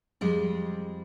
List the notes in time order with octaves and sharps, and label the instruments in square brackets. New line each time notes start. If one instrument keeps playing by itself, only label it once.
[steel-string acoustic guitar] F2 G3 G#3